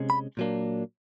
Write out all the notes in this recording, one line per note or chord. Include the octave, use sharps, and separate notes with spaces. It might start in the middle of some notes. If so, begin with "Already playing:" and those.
Already playing: C3 G#3 C#4
B5
A#2 F#3 A#3 D4